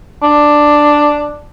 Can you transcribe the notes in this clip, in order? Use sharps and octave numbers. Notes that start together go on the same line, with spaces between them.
D4